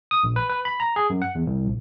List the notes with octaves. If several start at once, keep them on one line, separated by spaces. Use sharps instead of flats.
D#6
A#1
B4
B4
B5
A#5
G#4
F#2
F#5
E2
C2
A#1